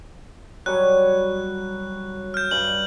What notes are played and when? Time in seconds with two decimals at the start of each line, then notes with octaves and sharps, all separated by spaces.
0.66 F#3 G3 C#5 F#6
2.34 F6 G6
2.51 G2 F#7